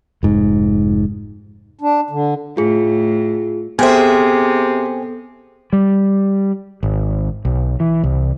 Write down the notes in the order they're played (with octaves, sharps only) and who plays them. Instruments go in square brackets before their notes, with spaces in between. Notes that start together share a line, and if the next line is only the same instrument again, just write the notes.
[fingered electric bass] F1 G#2
[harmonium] D4
D3
[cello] A2 [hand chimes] F4 G#4
[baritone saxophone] C3 [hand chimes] B3 A4 [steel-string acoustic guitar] G#4 E5 [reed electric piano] C5 G5 G#5
[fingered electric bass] G3
G#1
B1
E3
C2